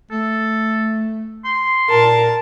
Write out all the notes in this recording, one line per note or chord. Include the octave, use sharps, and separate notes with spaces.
A3 A4
C6
A#2 A#4 A5